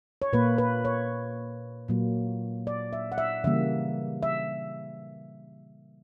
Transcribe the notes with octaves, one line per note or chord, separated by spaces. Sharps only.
C#5
A#2 A#3 B4
B4
C#5
A#2 F#3 A#3
D5
E5
F#5
E5
C#3 E3 G3 A#3 E5
E5